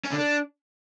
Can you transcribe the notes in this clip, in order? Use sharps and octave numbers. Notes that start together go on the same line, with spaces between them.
C#4
D3
D4